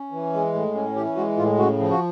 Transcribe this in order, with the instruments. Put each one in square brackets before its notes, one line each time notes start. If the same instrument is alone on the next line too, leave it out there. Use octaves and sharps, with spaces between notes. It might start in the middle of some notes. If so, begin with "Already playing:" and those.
Already playing: [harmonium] C#4
E3
G#3
A2
C#4
E3 G4
G#3 F#4
A2 F4
C#3 F#4
F3
F#4